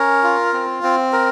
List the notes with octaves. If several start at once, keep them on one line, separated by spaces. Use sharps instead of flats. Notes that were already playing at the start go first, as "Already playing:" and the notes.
Already playing: C#4 A#4
F4
C4
C4
A#4